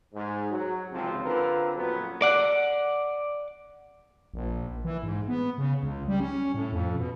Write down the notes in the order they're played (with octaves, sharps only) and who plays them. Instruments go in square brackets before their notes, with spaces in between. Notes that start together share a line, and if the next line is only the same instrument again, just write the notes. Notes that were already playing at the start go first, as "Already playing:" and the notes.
[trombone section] G#2
F#3
G#1 C#2 C3 F3 C4
D3 C4 F4 A#4 B4
F2 A#2 F#3 B3 C#4 B4
[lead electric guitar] D5 F#5
[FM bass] A#1
E3
G#2
B3
C#3
C#2
G3
C#4
A2
F2
B2